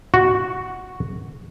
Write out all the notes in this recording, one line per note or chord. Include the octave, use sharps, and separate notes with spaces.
F#4